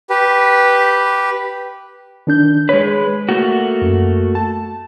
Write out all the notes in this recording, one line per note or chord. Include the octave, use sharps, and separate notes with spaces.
G4 B4
D#3 D4 G6
G#3 B4 C#5
A3 A#3 F#4
F#2
A5